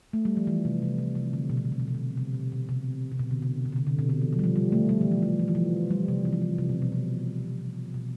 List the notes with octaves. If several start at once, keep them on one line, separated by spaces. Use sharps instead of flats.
A3
G3
F3
E3
C3
C3
C3
C3
D3
B2
C3
B2
C3
B2
C3
B2
C3
B2
B2
C3
C3
B2
D3
C3
C3
D3
C3
D3
B2
D3
E3
F3
G3
F3
G3
A3
G3
E3
F3
A3
F3
E3
F3
G3
C3
E3
F3
E3
C3
B2
B2
C3
B2